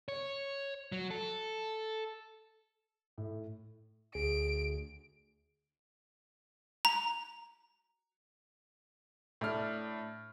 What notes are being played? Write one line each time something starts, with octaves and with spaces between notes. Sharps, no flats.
C#5
F#3
A4
A2
D2 G#4 D7
A#5
A2 D4 F6